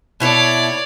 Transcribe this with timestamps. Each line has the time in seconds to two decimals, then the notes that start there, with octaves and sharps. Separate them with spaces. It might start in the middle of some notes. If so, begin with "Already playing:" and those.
0.20 B2 E4 A4 C#5 D5